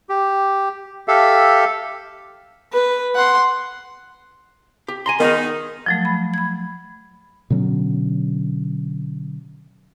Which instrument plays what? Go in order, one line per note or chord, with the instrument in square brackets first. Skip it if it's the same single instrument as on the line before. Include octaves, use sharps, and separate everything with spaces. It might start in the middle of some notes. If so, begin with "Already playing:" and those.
[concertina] G4
G4 A4 E5 F5
[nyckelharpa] B4
F#5 C6
[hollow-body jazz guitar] G4
G#5 A#5 C6
[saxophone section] D#3 D#4 [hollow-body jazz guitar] B3 G#4 A#4
[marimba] F3 F#3 A3
B5
B5 G#6
[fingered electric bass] B2 D3 F#3 C#4